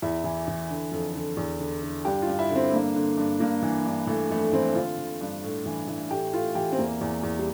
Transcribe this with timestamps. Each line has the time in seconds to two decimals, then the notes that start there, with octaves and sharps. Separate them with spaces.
0.02 E2 E4
0.24 E3
0.48 E3
0.70 D3
0.92 F2
1.16 D3
1.37 E2
1.60 D3
1.83 D3
2.05 G2 G4
2.22 F4
2.27 G2
2.39 E4
2.50 D3
2.55 C4
2.72 G2 A#3
2.96 D3
3.17 G2
3.40 G2 A#3
3.63 E3
3.86 G2
4.07 E3 A3
4.30 F2 A3
4.53 E3 C4
4.75 D3 F4
4.99 D3
5.21 G2
5.43 A2
5.66 E3
5.88 E3
6.10 A2 G4
6.33 A2 F4
6.55 E3 G4
6.72 C4
6.79 E2 A#3
7.01 E2
7.23 E2
7.39 G3